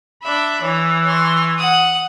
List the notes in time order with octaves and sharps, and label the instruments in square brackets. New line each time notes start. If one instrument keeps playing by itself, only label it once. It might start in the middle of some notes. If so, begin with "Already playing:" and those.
[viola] D4 B5 [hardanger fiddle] E5
[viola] E3 [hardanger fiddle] C#5
[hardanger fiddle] C6 C#6
F#5 D#6